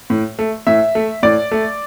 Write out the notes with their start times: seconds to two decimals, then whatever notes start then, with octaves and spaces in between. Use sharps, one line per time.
0.10 A2
0.39 A3
0.67 A2 E5
0.95 A3
1.23 A2 D5
1.51 A3